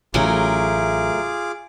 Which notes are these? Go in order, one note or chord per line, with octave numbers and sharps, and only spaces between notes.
A1 C#3 F#3 A3 F4 G#4 A#4 D6